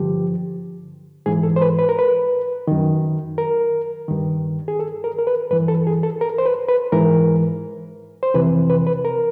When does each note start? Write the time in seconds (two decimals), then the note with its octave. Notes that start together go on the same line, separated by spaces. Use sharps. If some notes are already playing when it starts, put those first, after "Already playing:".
Already playing: G2 D3 F3 G4
1.26 G#2 E3 G#4
1.43 A4
1.56 C5
1.62 B4
1.79 B4
1.89 A#4
1.99 B4
2.67 F#2 D#3
3.38 A#4
4.08 G2 D#3
4.68 G#4
4.79 A4
5.04 A#4
5.19 A#4
5.27 B4
5.51 G2 E3 B4
5.68 A4
5.87 G#4
6.03 A4
6.21 A#4
6.38 C5
6.46 B4
6.69 B4
6.92 G#2 E3 A#4
8.23 C5
8.34 F2 C3 E3 B4
8.70 B4
8.87 B4
9.05 A#4